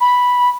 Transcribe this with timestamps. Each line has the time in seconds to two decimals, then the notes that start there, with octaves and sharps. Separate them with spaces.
0.01 B5